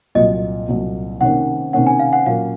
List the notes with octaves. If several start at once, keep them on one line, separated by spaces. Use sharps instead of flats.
C2 A#2 F#3 D#5
C2 A#2 F#3
C3 D#3 A#3 C#4 F#5
C3 D#3 A#3 C#4 F#5
G#5
F5
F#5
A#2 F#3 A#3 C#4 F5